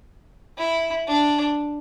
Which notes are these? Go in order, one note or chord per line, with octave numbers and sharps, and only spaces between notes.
E4
D4